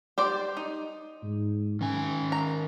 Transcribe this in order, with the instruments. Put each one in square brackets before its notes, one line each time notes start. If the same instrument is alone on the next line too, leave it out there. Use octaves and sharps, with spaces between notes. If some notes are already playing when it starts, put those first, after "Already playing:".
[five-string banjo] G4 C5 D5
D#4
[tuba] G#2
[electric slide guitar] D#3 G#5 [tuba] C#4
[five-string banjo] A#5